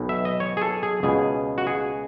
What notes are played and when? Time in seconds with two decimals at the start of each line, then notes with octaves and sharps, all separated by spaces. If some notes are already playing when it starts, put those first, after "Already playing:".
Already playing: B1 B2
0.09 E5
0.25 D#5
0.40 C#5
0.57 G#4
0.62 A4
0.83 G#4
1.03 C#2 B2 G#4
1.58 F#4
1.67 G#4